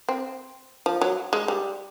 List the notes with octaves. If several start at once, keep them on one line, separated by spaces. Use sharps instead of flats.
C4
F3
F#3
G#3
G3